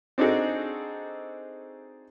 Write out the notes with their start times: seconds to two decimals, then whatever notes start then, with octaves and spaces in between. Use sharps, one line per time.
0.18 C4 D4 D#4 F#4 G#4 A4